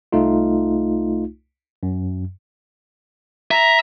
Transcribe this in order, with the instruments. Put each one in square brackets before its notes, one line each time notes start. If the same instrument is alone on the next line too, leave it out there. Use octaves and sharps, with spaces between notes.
[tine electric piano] C2 A3 D#4 F4
F#2
[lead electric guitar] E5 [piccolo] A#5